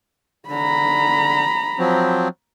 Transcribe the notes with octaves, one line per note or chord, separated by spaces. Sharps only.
D3 A#5 B5
F3 F#3 C4